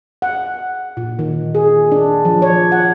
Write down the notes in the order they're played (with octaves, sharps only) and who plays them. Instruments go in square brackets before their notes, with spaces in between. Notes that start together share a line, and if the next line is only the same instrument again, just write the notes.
[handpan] F#5
A#2
D#3
G#4
D4
F3
C#5
F#5